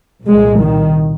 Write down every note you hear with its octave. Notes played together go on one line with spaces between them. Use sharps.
C2 A#2 G#3
D#3